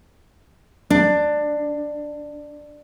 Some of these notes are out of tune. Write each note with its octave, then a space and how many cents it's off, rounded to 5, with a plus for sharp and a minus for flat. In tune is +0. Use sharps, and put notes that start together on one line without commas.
D4 +15